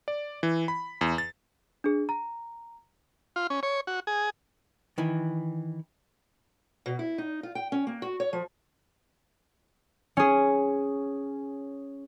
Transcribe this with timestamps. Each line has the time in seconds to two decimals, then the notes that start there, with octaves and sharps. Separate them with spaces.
0.08 D5
0.43 E3
0.68 B5
1.01 E2
1.18 A6
1.84 D4 G#4
2.09 A#5
3.36 F4
3.50 C#4
3.63 C#5
3.87 F#4
4.07 G#4
4.98 D#3 E3
6.86 B2
6.99 E4
7.18 D#4
7.43 F4
7.55 G5
7.72 C#4
7.87 A#3
8.02 F#4
8.20 C#5
8.33 F3
10.17 C#4 G#4